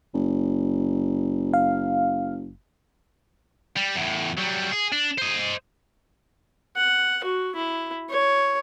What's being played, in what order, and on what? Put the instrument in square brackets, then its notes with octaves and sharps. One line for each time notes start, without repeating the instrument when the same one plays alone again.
[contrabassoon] F#1
[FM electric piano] F5
[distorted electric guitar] G3
E2 A2
F#3 G3
G#4
D4
C5 D#5
[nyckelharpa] F#5
F#4
E4
C#5